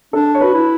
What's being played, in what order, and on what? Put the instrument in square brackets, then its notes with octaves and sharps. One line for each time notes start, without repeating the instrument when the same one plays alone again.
[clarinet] D4 [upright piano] A4
[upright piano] C#5
[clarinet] F#4 [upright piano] B4
[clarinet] E4